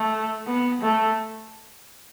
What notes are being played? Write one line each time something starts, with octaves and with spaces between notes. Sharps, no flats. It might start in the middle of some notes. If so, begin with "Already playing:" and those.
Already playing: A3
B3
A3